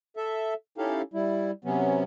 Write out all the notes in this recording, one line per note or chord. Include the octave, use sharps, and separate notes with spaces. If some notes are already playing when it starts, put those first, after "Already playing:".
A4 E5
C#4 D#4 E4 G4 A4 F5
G3 E4
C3 F#3 B3 C#4